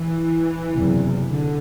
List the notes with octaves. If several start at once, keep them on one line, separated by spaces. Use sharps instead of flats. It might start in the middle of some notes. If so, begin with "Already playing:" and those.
Already playing: E3
F#1 E2 C3
D3